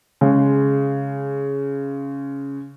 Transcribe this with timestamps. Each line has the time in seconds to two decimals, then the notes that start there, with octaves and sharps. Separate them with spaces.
0.21 C#3 G#3